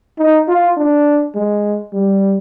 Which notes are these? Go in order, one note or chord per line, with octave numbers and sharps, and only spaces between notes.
D#4
F4
D4
G#3
G3